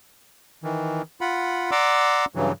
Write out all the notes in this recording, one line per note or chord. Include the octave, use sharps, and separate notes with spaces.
D#3 E3
F4 F#5 B5
D5 F#5 A#5 C6 D6 E6
G2 C#3 E3 F#3